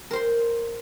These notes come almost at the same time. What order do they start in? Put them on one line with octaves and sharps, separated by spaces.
A#4 C5 C6